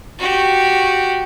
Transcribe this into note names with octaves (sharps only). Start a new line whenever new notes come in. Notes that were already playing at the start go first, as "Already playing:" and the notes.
F#4 G4